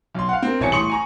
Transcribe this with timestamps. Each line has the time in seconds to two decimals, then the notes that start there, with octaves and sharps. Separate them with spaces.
0.15 B1 C6
0.29 F5 F#5
0.42 C4 A#4
0.60 E1 C2 C#5 G#5 A5 C#7
0.72 A2 C6 C#6 D#6 C#7 F#7
0.90 G#5 A#5 C#6